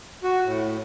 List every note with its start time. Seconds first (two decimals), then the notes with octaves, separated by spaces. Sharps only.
0.24 F#4
0.45 A2